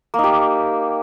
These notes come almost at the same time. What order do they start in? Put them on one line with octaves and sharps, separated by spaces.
A#3 D#4 G4